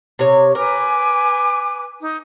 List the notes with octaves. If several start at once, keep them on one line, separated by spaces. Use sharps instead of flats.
C3 C#5
A#4 B4 G#5 D6
D#4